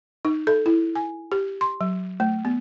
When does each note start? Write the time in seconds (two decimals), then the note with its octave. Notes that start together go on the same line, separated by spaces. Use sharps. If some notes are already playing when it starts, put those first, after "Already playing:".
0.25 D#4
0.47 A4
0.66 E4
0.95 G#5
1.32 G4
1.61 C6
1.81 F#3
2.20 A3
2.45 B3